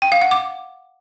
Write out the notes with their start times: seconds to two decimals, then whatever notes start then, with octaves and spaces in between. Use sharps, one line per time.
0.02 G5
0.12 F5
0.22 F#5
0.31 D6